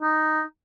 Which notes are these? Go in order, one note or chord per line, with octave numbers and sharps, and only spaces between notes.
D#4